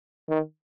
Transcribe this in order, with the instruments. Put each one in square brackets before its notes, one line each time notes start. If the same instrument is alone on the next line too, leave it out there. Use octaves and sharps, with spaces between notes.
[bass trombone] D#3